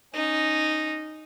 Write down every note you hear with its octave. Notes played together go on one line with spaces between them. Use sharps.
C#4 D#4